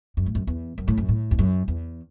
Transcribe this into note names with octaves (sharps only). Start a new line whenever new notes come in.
F#2
A2
F#2
E2
F#2
A2
F#2
A2
E2
F#2
E2